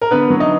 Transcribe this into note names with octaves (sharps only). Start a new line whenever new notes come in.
A#4
D3 B3 B4
F#3
D#4 D#5